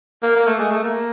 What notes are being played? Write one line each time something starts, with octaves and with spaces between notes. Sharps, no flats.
A#3
A#3
A3
G#3
A3
A#3